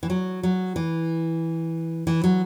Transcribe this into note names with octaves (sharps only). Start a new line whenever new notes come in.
E3
F#3
F#3
E3
E3
F#3